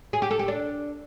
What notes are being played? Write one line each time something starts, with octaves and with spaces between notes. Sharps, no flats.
G#4
G4
A4
G4
D4